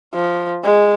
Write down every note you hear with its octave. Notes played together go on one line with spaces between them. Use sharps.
F3
G#3